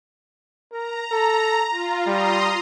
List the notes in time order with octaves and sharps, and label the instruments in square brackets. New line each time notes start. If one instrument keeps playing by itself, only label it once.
[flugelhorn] A#4 [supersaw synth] A#5
[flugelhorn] A4
[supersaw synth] F4
[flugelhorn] G3 [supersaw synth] A#5 C6 D#6